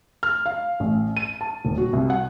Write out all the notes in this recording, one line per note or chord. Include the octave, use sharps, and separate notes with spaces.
F6
F5
A1
D#7
A5
D#1
F#4
C2
F#5